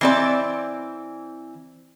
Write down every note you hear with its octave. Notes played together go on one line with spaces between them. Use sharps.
E3 C4 D5